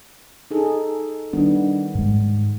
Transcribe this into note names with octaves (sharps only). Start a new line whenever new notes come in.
D#4 G#4 A4
D#3 G3 B3 D4
G#2 G#3